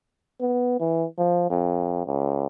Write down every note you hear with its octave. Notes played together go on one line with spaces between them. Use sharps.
B3
E3
F3
F2
C#2